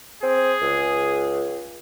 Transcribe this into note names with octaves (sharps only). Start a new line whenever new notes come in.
C4 G#4
C#2